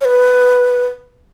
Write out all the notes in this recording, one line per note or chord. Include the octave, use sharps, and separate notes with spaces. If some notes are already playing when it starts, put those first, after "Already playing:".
C#5
B4